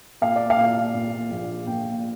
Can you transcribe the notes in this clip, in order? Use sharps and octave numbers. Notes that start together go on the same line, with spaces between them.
A#2 F5
D5
F5
A#2
A#2
A#1
A#2 G5